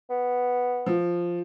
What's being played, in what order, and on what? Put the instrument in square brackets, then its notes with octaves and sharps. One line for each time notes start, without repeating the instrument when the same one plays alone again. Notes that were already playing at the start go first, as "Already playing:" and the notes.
[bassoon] B3
[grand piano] F3